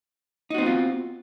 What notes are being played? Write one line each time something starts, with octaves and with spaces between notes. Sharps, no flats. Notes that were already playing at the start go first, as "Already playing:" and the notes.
B3 C4 D#4 F4 F#4